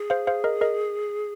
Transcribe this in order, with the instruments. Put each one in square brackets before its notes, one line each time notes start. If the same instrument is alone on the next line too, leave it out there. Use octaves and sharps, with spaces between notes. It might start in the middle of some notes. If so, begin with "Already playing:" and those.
Already playing: [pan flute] G#4
[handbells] C5 F5
C5 F5
A#4 D#5
A#4 D#5